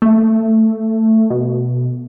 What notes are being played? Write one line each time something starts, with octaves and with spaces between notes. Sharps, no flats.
A3
B2